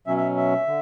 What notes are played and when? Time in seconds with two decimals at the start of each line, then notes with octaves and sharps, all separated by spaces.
0.07 B2 F#3 C#4 E5
0.17 E5
0.36 E5
0.67 D3